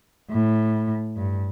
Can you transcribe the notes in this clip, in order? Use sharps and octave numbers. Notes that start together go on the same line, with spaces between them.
A2
G2